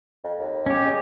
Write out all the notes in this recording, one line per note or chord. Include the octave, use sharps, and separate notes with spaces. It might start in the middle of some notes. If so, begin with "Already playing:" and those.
F2
D#2
C#4 G4
G#3